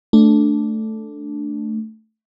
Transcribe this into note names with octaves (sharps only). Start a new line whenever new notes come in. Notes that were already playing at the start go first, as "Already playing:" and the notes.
A3 D4